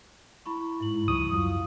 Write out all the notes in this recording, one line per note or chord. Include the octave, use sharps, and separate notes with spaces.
E4 B5 C#6
G#2 E4 F#7
C#2 F3 G3 C#6 D#6
F#2 F#3 F4